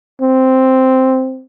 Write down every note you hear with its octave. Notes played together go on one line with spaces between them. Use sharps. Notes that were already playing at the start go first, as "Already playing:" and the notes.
C4